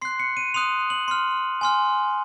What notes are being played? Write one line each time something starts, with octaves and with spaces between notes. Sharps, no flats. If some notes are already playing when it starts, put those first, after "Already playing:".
C6 F#6 C7
C#7
D#7
C6 D#6 F#6 F7
F#7
C6 F6
G#5 C6 F6